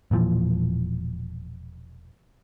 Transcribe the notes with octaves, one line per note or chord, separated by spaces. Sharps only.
E1 A#2 E3 F3